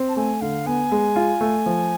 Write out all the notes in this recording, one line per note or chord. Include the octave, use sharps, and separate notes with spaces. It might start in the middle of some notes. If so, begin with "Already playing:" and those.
Already playing: C4
A5
A3 G#5
D3 F5
B3 G#5
G#3
F4
A3
F3